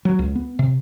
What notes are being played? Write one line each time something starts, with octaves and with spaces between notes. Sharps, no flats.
F#3
C#2
B3
C3